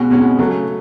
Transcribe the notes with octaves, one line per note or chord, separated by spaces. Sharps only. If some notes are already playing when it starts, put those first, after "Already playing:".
Already playing: B2 G#3 C#4 F#4
B2 G#3 C#4 F#4
C#3 F#3 A3